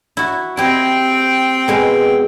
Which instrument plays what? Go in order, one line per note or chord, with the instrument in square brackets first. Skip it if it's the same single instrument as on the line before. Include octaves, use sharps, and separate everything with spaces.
[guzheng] E4 F#4
[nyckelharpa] C4 G5 [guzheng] E4 G4 D#5
[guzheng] B2 G#3 B3